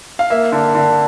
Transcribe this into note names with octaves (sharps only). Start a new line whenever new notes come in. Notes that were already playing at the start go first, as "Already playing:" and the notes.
F5
A#3 E5
D3
D3